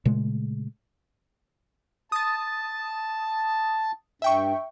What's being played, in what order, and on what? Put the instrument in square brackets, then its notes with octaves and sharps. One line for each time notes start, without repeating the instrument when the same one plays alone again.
[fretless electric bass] A#2 C#3 G#3 A3
[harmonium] A5 [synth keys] D#6 A6
[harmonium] G2 [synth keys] E5 G5 C#6